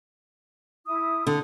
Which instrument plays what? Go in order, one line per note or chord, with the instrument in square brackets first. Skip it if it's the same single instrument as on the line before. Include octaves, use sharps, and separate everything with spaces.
[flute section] E4 D#6
[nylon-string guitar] D3